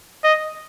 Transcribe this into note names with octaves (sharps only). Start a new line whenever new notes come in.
D#5